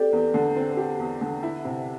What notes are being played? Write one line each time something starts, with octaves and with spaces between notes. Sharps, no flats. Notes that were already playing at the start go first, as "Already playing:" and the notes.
Already playing: C4 G4 A4 D5
E2
D3
C4
G4
E2
D3
E4
C3